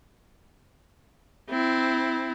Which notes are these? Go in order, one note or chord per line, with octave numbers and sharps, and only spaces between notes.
C4 E4